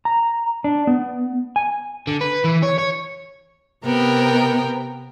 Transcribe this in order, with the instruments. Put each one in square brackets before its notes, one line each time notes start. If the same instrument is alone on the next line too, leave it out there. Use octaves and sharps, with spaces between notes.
[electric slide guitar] A#5
D4
B3
G#5
[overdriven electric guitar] D3
B4
E3
C#5
C#5
[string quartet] C3 B3 A#4 G5